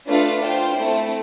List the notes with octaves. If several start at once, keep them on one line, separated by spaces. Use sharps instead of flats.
A3 D4 F4 B4 F5
F4 C5 G5
A3 C4 E4